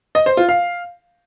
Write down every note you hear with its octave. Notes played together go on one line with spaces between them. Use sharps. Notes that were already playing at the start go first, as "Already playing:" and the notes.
D#5
C5
F4
F5